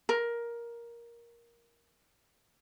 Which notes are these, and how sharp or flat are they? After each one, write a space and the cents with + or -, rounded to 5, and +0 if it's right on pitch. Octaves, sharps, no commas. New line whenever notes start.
A#4 +10